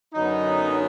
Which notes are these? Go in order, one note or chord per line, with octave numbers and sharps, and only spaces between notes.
F#2 D3 F#3 B3 D#4